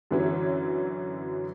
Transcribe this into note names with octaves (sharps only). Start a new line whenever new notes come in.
F#2 D3 E3 F#3 C#4